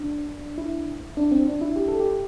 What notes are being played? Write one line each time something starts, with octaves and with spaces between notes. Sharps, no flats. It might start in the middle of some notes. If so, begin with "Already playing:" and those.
Already playing: D4
E4
D4
C4
D4
E4
G4
A4
G4